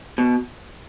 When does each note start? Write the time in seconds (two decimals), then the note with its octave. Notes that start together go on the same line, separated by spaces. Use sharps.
0.18 B2